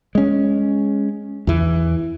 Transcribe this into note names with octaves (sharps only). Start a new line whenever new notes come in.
G#3 C#4
E2 E3